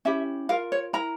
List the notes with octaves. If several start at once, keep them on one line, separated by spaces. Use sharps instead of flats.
C#4 E4 G4 E5
F4 A#4 F5
C#5
E4 A#4 A#5